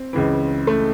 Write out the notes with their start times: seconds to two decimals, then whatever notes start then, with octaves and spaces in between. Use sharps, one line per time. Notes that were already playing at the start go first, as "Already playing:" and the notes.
Already playing: C4
0.13 C#2 C#3 E3
0.67 A3